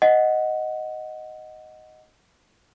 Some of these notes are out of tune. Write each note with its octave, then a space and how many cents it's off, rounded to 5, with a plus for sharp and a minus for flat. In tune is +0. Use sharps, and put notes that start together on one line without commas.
D#5 +0 F#5 +0